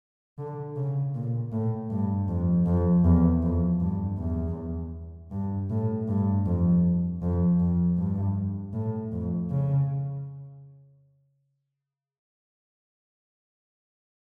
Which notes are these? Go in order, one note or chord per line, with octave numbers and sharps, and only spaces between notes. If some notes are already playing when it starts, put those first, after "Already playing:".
D3
C#3
A#2
A2
G2
F2
F2
E2
F2
G2
E2
G2
A2
G2
F2
F2
F2
G2
A2
F2
C#3